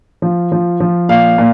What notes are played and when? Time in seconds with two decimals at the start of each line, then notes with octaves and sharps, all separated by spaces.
0.22 F3
0.52 F3
0.80 F3
1.09 A#2 F5
1.38 A#2